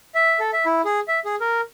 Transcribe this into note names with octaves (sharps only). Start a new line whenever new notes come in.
E5
A4
E5
E4
G#4
E5
G#4
A#4